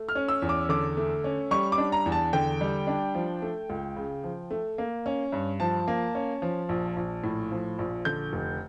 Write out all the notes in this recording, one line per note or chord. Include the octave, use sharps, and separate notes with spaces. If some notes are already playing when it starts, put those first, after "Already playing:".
Already playing: A3
F6
C#4
E6
E2
D6
D3 D6
A3
C#4
G3 C#6
D6
D4
A#5
E2
A5
D3 G5
G3
D4
F3
A3
C#2
C#3
F3
A3
A#3
C#4
G2
F3 A5
A#3
C#4
F3
A#1
A#1
A2
F3
A#1
D3 G6
F1